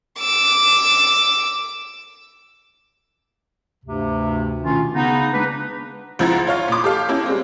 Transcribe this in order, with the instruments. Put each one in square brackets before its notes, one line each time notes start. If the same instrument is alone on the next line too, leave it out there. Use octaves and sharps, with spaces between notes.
[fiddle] D6 E6
[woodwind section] D2 G2 C3
B2 D#3 A3 C#4 F4
C#3 B3 D#4
G#3 A#3 D4 B4
[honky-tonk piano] C#2 F3 E4 F#5 A#5 G#6
F4 C#5 F5
A#2 D6
G4 A4 F5
A#3 C#4 E4
G3 G#3 C4